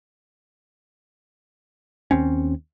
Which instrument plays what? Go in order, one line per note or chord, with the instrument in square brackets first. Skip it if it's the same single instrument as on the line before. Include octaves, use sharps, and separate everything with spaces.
[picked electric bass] D#2 C4 C#4